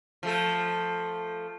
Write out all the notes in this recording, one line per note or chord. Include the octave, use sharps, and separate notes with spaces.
F3 A3 A4